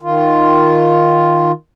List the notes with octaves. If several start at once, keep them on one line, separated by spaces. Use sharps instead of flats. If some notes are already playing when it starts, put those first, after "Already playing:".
D#3 F4